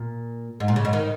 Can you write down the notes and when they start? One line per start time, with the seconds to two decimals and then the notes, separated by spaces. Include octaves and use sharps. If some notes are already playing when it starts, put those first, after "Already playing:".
Already playing: A#2
0.60 G#2
0.68 A#2
0.76 C#3
0.85 G#2
0.93 D#3